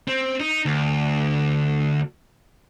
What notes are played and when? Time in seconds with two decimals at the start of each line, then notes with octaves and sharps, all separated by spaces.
0.08 C4
0.40 D#4
0.65 D2